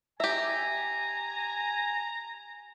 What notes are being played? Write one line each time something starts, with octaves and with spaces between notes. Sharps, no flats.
G4 E5 G#5 A#5